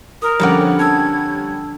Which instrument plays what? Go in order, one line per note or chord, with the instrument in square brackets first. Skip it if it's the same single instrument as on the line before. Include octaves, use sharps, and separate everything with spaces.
[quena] A#4 [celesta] D#6 F6
[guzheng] F2 D3 D5 [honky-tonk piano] G3 C#4 F#5
[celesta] A5 E6 [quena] G#6